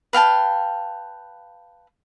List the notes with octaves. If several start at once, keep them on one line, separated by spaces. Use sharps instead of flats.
B4 F5 G5 A5